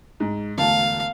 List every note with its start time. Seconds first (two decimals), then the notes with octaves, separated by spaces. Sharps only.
0.20 G#2
0.58 E1 D2 F5 A5